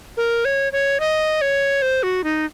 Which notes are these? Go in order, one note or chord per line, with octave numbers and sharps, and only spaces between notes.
A#4
C#5
C#5
D#5
C#5
C5
F#4
D#4